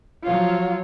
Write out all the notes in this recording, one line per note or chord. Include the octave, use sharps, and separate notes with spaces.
F3 F#3 F4 C#5 F5